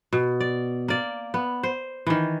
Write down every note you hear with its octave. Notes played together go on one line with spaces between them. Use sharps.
B2
D5
A#3 D5
B3
C5
D#3 E3